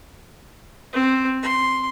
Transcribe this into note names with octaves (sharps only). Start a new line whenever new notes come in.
C4
C6